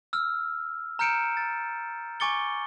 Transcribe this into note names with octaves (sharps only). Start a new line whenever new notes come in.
E6 F6
A#5 F6 G6 C#7 D7 E7
A6
G#5 C#6 D6 A6 C#7 G7